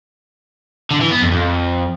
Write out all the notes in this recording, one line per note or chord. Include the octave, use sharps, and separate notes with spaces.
D3
E3
B3
F2
F2